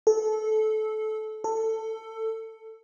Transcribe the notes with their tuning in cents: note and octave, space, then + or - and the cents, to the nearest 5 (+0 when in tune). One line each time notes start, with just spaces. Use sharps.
A4 -20
A4 +15